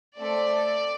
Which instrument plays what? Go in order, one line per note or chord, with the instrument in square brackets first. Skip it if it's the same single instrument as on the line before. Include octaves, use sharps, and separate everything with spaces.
[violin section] A3 C4 A4 D5